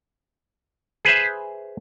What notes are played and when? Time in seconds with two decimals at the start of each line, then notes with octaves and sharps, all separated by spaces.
1.05 G#4 B4 C5 E5